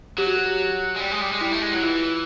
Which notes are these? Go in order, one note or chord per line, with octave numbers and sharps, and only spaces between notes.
F#3 G4
F#4
G4
G#3
G3
G#3
G3
G#3
G3 E4
A3
G#3
F#3 E4
E3 F4